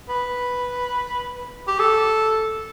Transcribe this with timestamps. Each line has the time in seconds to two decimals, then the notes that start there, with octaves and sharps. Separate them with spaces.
0.09 B4
1.68 G4
1.79 A4